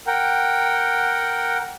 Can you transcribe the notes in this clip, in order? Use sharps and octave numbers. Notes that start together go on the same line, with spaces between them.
A#4 F#5 G5